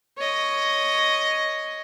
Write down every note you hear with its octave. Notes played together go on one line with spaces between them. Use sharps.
C#5 D#5